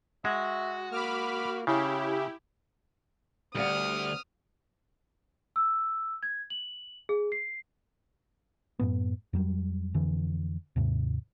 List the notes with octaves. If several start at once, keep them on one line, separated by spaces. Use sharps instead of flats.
G#3 F#4 E5
A#3 B5 D6 F6
C#3 C#4 E4 G4
D2 G3 D5 F#5 D#6 F6
E6
G#6
F#7
G#4
C7
F#2 A2 B3
F2 F#3 G3
F2 D3 E3
D#2 G#2 C3